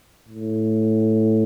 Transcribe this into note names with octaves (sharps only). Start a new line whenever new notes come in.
A2